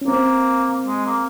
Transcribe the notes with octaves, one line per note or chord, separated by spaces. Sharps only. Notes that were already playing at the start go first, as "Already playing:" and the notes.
C#4
A#3 C4
G#3
A#3